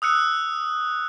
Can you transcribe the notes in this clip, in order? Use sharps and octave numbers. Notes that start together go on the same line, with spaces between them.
D#6 E6 F#6 C#7